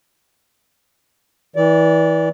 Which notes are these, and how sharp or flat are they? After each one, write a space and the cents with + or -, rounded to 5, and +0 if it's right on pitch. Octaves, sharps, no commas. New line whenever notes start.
E3 -30 D5 -20